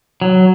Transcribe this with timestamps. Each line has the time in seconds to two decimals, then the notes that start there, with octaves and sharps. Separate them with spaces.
0.22 F#3